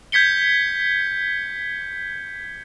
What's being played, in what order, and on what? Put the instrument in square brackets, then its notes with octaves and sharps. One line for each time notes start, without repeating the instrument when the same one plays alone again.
[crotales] G6 G#6 B6 C#7 G7